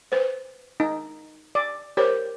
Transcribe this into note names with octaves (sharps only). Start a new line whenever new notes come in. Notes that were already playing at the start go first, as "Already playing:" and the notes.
B4 C5
D#4
D5
G4 A#4 C5 C#5